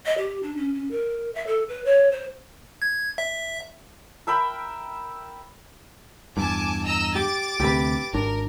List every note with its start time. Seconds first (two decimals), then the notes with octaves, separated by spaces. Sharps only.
0.06 D#5
0.18 G4
0.43 D4
0.57 C#4
0.74 C#4
0.91 A#4
1.35 E5
1.47 A4
1.69 B4
1.85 C#5
2.12 C5
2.82 G#6
3.18 E5
4.27 A#4 E5 G5 B5
6.37 E2 G2 G#5 A5 D6
6.85 D#5 A#5 E6
7.15 G4 D6 A6
7.60 D2 C3 G4 B4
8.14 G#1 D4 A#4